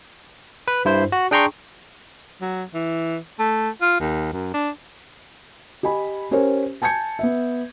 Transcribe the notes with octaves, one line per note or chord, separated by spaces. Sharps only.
B4
G2 E4 C5
F#4
D4 G#4 G5 A#5 C6 C#6
F#3
E3
A3
F4
D#2
F#2
D4
G4 D#5 G#5 B5
C#4 G4 A#4 C5 C#5
G#5 A5 G6 G#6 C#7
B3 E5